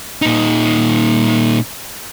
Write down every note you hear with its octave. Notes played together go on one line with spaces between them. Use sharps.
A#2 D#4